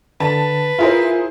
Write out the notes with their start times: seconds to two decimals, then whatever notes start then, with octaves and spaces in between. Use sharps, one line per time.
0.20 D3 B4 A5
0.79 E4 F4 G#4 A#4 C5